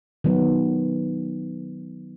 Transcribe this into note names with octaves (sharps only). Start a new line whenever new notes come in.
D#3 F#3 B3